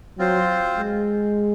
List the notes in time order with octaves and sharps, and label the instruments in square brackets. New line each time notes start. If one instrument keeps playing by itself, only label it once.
[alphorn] F#3 [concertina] C4 F4 C5
[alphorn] G#3